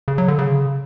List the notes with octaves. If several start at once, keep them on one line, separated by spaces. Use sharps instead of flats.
C#3
F#3
D3
C#3